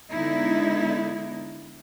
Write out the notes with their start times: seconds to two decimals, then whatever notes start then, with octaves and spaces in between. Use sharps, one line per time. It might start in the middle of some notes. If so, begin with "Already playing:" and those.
0.12 D3 G#3 B3 D#4 E4